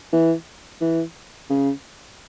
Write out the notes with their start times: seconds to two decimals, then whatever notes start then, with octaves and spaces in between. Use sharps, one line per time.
0.13 E3
0.81 E3
1.50 C#3